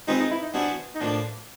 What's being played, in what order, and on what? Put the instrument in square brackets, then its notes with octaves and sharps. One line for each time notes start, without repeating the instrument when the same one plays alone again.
[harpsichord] G#3 C4 F4 G#4 B4 [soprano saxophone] D#4
[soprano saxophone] D#4
E4
D#4
[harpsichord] F#3 B3 E4 G#4 C5 [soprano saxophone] D4
[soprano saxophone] D#4
[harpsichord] A2 F3 A#3 [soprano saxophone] D4